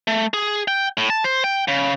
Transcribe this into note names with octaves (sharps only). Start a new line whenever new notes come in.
A3
G#4
G5
A2
A5
C5
G5
C#3